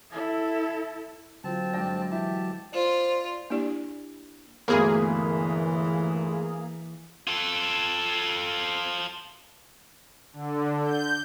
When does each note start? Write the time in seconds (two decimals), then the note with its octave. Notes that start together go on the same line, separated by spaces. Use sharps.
0.10 E4 A4
1.44 D3 F#3 C4 F4 A5
1.73 G2 G#3 C5 D5 G5 A#6
2.11 E3 E4 G4 A5
2.74 F4 C5 D5
3.50 A#3 D4 E4 G4 D5
4.68 G1 D2 E3 A#3 G#4
7.27 F4 A4
10.33 D3
10.84 G6